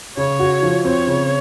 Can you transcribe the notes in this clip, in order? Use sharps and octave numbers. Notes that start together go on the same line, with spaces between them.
C#3 C#5
F#4
F3
C4 C#5
C#3